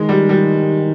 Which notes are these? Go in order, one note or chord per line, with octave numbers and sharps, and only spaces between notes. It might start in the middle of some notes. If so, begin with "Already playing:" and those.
Already playing: D#3 G#3
G3
G3